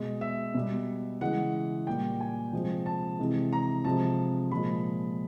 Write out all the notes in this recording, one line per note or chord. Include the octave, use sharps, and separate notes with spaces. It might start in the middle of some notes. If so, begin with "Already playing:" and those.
Already playing: B2 G#3
E5
B2 G3
C#3 E3 G#3 F#5
A#2 G3 G5
G#5
C3 F3 G#3
A5
C3 E3 G#3
A#5
C3 F3 G#3 A5
A#2 F3 G#3 B5